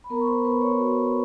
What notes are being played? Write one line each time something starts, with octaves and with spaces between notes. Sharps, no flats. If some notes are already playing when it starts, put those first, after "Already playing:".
B5
B3 A#4 A#5
C#6
C5 C6
B3 B4 B5
C#5 C#6
F#4